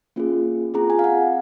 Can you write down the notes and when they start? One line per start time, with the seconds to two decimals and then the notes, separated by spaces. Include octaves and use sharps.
0.16 A#3 C#4 F4 G#4
0.74 C4 F4 G#4 A#5
0.90 G#5
0.99 F5
1.04 F#5